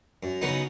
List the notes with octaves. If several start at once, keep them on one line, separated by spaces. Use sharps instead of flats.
F#2
C#3 F#3 B3 D#4